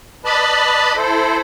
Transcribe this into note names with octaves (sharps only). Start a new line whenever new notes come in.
B4 D5 D#5 A5 B5
E4 A4 C5